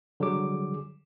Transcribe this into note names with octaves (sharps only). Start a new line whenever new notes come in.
D3 F#3 G3 G#4 D6